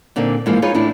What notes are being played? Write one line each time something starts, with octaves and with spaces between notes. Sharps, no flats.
A#2 D3 A#3 C4 D#4
G#2 E3 F3 G#3 A#3
D#4 F4 G#4 B4 C#5 F5
E2 A2 D4 E4